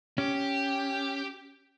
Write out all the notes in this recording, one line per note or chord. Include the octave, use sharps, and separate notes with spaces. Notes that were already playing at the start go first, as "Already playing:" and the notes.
C#4 G4